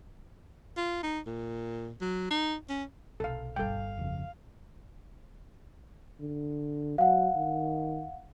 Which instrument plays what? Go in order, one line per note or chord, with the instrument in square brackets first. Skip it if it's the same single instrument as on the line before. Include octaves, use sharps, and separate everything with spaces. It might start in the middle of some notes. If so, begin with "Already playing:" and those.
[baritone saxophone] F4
D#4
A#2
F#3
D#4
C#4
[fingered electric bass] B1 [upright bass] C3 [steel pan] A4 F5
[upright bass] G1 G3 [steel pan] A4 G5 [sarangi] F5
[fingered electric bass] F1 F2 C#3
[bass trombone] D3
[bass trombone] F#3 [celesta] F5 F#5
[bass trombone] D#3